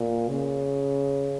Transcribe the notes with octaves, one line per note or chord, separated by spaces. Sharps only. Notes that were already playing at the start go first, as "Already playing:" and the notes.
Already playing: A#2
C#3